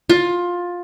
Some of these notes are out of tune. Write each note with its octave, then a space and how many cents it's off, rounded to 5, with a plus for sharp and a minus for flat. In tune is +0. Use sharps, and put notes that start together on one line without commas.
F4 +15